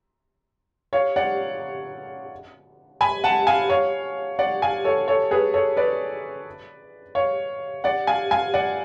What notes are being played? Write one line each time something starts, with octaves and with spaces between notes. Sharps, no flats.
C#5 F5
D5 F#5
G#5 B5
F#5 A5
F5 G#5
C#5 F5
D5 F#5
F5 G#5
A4 C#5
A4 C#5
G#4 B4
A4 C#5
B4 D5
C#5 F5
D5 F#5
F5 G#5
F5 G#5
D5 F#5